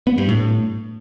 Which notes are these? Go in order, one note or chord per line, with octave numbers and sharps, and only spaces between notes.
B3
G2
A2